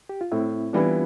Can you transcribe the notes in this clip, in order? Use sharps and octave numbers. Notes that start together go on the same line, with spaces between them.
G4
F4
A2 C4 E4
E3 G3 B3 D4 E4 F4